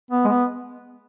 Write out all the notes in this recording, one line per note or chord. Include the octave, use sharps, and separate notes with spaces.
B3
G#3
B3